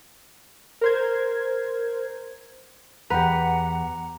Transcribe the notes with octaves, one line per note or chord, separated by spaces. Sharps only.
A#4 C5 G#6
E2 G4 B4 F#5 A#5